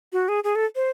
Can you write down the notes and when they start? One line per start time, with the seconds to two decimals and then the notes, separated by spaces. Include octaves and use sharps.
0.13 F#4
0.28 G#4
0.44 G#4
0.55 A4
0.76 C5